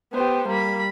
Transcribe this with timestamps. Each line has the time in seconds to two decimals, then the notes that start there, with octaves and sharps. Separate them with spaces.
0.14 B3 G4 C5
0.48 G3 A#3 B5